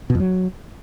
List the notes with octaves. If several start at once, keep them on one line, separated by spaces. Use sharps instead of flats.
B2
F2
F#3